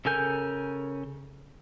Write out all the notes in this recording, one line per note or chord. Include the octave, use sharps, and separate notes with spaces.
C#3 A4 A#4 G#5 G6